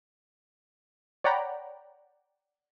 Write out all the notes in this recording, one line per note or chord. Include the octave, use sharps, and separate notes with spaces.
C#5 D5 F#5 G5 A#5 B5